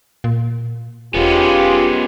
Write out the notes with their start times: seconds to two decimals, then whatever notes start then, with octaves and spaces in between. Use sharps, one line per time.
0.24 A#2
1.14 E1 G#3 B3 C#4 F4 G4